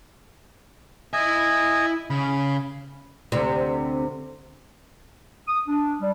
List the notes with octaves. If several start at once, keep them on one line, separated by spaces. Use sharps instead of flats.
E4 D#5 E5 G#5
C#3 B5
D2 C3
D#6
D4
G3